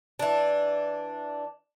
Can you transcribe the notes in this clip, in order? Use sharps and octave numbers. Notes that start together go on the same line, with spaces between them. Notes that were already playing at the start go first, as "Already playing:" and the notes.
E3 D4